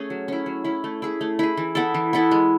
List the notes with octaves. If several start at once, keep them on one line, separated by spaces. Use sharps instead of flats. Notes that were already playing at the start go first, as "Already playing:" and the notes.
Already playing: A3 C#4 G#4
F#3
C#4 E4
F#3
C#4 E4
A3
E4 G#4
A3
E4 G#4
E3
B3 E4 A4
E3
B3 E4 A4
G#3